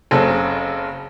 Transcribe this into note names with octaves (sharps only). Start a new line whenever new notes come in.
F#1 C#3 F#3 C4 A4